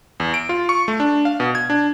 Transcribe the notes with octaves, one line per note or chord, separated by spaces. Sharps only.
E2
D7
F4
C#6
A3
D4
F5
B2
G#6
D4